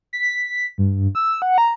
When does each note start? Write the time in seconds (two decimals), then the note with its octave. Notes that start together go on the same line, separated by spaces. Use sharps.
0.13 B6
0.78 G2
1.15 E6
1.42 F#5
1.58 A#5